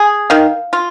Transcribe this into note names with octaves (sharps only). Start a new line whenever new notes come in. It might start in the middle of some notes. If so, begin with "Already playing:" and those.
Already playing: G#4
D#3 F5
F4